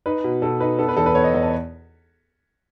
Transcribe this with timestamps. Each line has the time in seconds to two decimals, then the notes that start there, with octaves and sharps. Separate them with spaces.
0.06 D#4 B4
0.24 B2
0.42 B2 A4
0.60 D#4 B4
0.79 B3 A4
0.89 B4
0.97 E2 A4
1.06 B4
1.15 B3 C#5
1.24 D#5
1.34 E2 D#5
1.42 A5